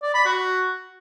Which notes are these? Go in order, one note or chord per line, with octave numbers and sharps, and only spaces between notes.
D5
B5
F#4